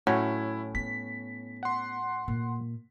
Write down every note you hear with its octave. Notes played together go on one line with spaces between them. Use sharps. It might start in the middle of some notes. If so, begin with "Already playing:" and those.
A2 F#3 C#4 E4
B3 B6
F#5 C6
A#2